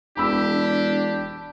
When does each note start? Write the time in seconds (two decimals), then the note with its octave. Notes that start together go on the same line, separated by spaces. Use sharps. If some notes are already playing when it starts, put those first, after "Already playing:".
0.17 E1 D4 G4 B5 E6